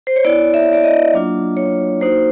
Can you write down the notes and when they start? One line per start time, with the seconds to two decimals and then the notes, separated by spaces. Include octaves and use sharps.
0.07 C5
0.16 C#5
0.24 B3 E4 D5
0.54 E5
0.73 D5
0.84 D#5
1.13 F#3 A#3 D4 F4
1.57 C#5
2.01 A#3 D#4 F#4 C5